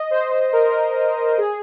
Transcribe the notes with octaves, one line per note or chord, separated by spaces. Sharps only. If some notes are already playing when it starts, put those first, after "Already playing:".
Already playing: D#5
C5
C5
A#4
G#4